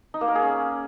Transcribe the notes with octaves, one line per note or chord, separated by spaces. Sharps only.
D#4
A#3
A#4
G#4
C#4